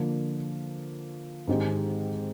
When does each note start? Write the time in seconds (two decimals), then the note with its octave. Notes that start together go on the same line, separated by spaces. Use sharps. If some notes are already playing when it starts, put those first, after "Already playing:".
Already playing: D3 F3 A#3
1.48 G#2 D#3 G#3 C4 G4